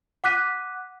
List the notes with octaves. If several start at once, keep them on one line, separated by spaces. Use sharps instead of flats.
F#5 D6 F#6 B6 D#7